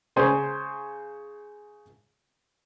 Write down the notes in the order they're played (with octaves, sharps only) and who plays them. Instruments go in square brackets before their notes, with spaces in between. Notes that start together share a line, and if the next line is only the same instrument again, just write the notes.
[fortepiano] C#3 C5 G#5